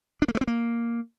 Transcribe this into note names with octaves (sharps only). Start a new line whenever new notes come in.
D4
A#3
A3
C4
A#3